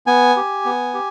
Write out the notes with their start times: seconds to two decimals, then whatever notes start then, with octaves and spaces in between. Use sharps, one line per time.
0.07 B3 G#5
0.37 G4
0.65 B3
0.94 G4